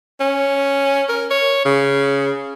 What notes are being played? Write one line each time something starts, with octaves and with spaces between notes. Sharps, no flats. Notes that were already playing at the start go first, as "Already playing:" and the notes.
C#4
A#4
C#5
C#3